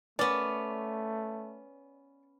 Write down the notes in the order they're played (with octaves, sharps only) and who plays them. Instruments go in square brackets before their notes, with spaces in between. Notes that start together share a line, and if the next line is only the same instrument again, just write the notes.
[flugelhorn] A3 [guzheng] B3 C#4 [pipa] D5